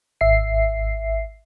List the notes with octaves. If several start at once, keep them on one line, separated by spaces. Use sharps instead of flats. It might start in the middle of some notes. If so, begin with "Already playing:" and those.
G#1 E5 C7